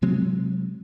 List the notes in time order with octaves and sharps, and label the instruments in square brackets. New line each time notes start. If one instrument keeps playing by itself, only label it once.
[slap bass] C3 F#3 G#3 C4